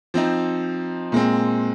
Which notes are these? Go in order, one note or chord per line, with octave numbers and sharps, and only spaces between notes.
F3 C4 D#4
A#2 G#3 C4